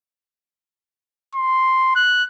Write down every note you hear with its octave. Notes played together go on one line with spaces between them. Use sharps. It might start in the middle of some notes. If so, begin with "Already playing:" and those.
C6
F#6